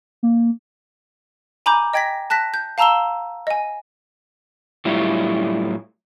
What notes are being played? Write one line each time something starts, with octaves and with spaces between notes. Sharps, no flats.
A#3
G#5 A#5 B5 D6 G6
D#5 G5 G#6 A#6 B6
A5 F#6 A#6 B6
G6
F5 A5 A#5 E6 E7 G7
D#5 G#5
A2 F#3 G3 E4 F4